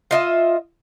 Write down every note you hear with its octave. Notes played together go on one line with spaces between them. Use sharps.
F4 D#5 E5